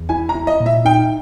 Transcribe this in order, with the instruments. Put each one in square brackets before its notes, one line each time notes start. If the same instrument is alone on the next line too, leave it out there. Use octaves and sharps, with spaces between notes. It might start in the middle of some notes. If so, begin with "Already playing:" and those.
Already playing: [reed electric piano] E2
[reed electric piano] E4 [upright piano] G#5
[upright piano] A#5
[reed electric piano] E4
[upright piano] D#5
[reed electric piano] A#2
[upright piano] E5
[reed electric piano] D#4 [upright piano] G5